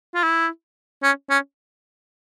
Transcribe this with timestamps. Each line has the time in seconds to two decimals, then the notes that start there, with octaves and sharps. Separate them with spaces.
0.14 F4
0.23 E4
1.03 C#4
1.30 C#4